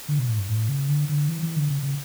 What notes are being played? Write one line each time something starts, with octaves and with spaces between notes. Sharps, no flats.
D3
B2
A2
G2
A2
C#3
D3
D3
E3
E3
D3
C#3
C#3